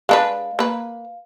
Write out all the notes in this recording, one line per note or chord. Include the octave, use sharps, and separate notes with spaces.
G#3 D4 B4 F5
A#3 B4